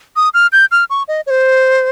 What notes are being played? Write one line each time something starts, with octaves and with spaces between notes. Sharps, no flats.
D#6
F6
G6
F6
C#6
D#5
C#5
C5